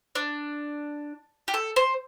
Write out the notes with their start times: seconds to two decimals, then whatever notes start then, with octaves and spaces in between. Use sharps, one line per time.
0.15 D4
1.48 G4
1.54 A4
1.76 C5